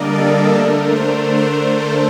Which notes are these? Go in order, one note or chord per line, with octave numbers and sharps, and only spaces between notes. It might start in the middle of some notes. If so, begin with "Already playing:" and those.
Already playing: D3 G3 A#3 D4 A#4 D5 D#5
A4
D3 A3 D4 A#4
C5
C5
A4